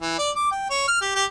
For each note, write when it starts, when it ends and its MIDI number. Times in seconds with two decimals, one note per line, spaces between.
0.01 0.14 52
0.19 0.30 74
0.36 0.48 86
0.51 0.68 79
0.70 0.84 73
0.88 0.98 89
1.01 1.13 67
1.15 1.25 67